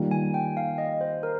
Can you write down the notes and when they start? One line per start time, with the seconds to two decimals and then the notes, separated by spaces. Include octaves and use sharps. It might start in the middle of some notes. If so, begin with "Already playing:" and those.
Already playing: D#3 G3 A#3 F4
0.11 G#5
0.34 G5
0.57 F5
0.78 D#5
1.01 C5
1.23 A#4